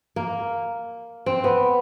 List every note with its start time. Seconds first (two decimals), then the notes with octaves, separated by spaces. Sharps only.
0.16 A#3
1.26 C4
1.44 B3